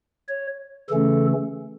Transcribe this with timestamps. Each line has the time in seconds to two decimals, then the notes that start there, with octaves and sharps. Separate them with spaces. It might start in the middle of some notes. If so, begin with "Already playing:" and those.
0.28 C#5
0.89 C#3 E3 A3 C#4 A4